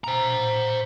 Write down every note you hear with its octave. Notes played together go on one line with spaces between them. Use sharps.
C5 A#5